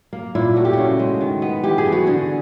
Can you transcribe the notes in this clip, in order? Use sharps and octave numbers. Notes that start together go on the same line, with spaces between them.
A#3
A#2 E4
A3 F#4
G4
C#3 F#4
G#3
D#3
B3
E3 G4
G#4
B3
F#4
D3 G#4